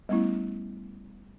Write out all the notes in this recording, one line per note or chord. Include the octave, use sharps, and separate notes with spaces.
G3 A3 B3 C#4 E4